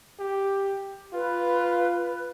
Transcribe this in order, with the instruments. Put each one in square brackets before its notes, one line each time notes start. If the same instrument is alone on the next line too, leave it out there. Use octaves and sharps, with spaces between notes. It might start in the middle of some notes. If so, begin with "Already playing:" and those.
[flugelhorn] G4
[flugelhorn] F4 [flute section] B4